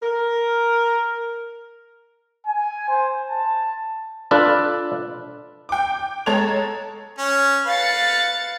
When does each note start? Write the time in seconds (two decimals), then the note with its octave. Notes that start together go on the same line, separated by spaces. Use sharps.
0.03 A#4
2.47 G#5
2.89 C5
3.29 A5
4.31 D4 F4 A4 B4 D5
5.69 G5 D6
6.26 G#3 A4 C#5 A#5 G#6 F7
7.18 C#4
7.66 B4 F5 A6 C#7